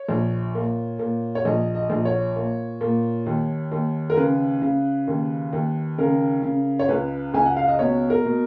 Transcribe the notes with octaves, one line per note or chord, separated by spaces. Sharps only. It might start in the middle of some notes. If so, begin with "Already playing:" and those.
Already playing: C#5
A#1
A#2
A#2
C#5
A#1 D#5
D#5
A#1
C#5
A#2
A#2
D#2
D#2
A#4
C#3 B4
C#3
D#2
D#2
C#3 A#4
C#3
C#5
C#2 B4
C#2 G#5
F#5
F5
D#5
B2 C#5
A#4
B2